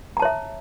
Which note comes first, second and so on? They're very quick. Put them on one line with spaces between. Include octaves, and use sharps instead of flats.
A#5 A5 C#5 E5